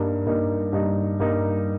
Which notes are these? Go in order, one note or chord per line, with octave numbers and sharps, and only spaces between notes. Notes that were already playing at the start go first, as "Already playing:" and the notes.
Already playing: G2 G3 A#3 D#4
G2 G3 A#3 D#4
G2 G3 A#3 D#4
G2 G3 A#3 D#4